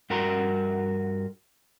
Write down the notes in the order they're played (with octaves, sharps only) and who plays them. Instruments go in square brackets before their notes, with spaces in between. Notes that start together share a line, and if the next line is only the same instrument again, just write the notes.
[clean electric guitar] G2 F#4 A#4 A#5 C6